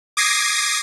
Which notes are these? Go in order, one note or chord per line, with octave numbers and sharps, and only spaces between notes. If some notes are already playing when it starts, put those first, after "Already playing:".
D6 D#6 G#6 A#6 C7